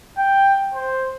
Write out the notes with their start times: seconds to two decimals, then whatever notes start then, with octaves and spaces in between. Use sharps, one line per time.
0.18 G5
0.74 C5